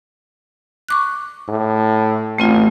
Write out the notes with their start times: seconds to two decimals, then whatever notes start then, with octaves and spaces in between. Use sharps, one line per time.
0.89 C#6 D6 F#6
1.48 A2
2.38 A1 A3 C4 F4